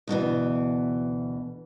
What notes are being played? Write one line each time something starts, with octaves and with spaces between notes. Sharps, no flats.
D2 B2 D#3 E3